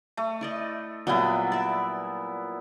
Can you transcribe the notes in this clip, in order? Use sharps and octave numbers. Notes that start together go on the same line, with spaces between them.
A3
E4 D5 D#5
A#2 F#3 G3 B3 E4 B4
D5 E5